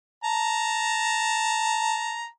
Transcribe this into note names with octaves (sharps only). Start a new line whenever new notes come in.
A5 A#5